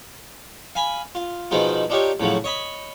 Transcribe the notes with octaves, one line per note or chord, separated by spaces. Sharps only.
F5 G#5 B5
F4
B2 D#3 F3 G#3 D#4 F4
D4 D#4 F4 G4 C#5
A2 C#3 F3 F#3
C#5 D#5 B5